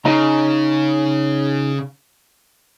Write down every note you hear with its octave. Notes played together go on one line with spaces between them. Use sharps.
C#3 D#4 D#5 A#5